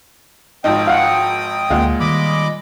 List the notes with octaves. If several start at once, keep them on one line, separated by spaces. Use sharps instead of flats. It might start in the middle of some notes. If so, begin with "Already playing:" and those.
G#1 F3 D#4 G5 D#6
F5 F#5
D2 A#2 G#3 F5 F#5
D#3 G3 D#5 B5 D6